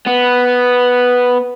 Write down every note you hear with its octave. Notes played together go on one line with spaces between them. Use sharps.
B3